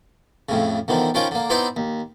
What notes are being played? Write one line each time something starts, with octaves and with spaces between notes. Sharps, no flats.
F2 A2 C#3
E2 D3 D#3 F3
D#3 F3 C#4 F4 A#4 G5
D3 A#3
B3 C4 D#4 E4 C5 D5
D#2